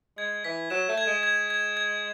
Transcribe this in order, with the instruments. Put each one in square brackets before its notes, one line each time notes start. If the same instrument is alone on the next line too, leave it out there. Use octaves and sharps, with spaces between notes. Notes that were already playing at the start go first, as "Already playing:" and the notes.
[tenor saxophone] G#3 [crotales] G#6
[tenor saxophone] E3 [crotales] B6
[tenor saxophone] F#3 [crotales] E7
[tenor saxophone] A3
[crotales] G#6
[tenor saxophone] G#3
[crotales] G#6
G#6
G#6